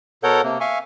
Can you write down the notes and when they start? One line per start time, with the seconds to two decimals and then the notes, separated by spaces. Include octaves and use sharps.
0.23 B2 A4 A#4 C#5 F#5 G6
0.44 C3 A#3
0.61 E5 F5 G#5 C#6